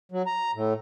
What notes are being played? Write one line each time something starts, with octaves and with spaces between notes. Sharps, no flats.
F#3
A#5
A2